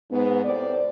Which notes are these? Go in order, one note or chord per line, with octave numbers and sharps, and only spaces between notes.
G#2 B3
A2 C3 C5 D5